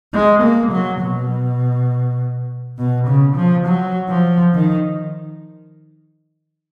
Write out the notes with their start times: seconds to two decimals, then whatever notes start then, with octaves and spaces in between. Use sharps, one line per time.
0.13 G#3
0.42 A#3
0.72 F#3
1.01 B2
2.78 B2
3.07 C#3
3.36 F3
3.66 F#3
4.09 F3
4.54 D#3